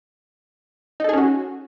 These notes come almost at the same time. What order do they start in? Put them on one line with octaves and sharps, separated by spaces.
D#4 A4 G#4 C#4 F#4